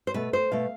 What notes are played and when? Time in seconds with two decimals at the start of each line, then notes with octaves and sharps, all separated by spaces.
0.07 C5
0.14 B2 A3 B4
0.33 C5
0.52 B2 A3 F5